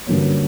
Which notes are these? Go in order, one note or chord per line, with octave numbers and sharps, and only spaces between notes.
G2 D3 F#3 A#3 C#4